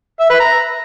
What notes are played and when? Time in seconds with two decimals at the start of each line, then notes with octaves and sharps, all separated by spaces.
0.20 E5
0.30 B4
0.40 A#5